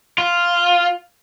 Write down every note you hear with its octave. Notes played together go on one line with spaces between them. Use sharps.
F4